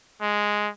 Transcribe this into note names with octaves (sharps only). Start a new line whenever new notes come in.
G#3